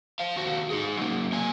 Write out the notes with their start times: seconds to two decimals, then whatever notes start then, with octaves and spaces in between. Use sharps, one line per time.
0.20 C5 F5
0.36 D#2 F#4
0.70 D#4 G#4
0.97 F#3 A#3
1.33 A#3 G#5